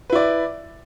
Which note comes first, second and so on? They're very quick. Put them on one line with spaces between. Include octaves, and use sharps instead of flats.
B4 E4 D5